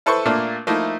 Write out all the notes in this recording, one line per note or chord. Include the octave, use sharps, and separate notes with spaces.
E4 A4 B4 C5 C#6
A#2 A3 A#3 D4
F3 A3 A#3 D#4 E4